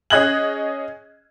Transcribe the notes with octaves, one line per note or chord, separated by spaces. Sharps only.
C#4 G#4 D#5 F#6 G#6 F#7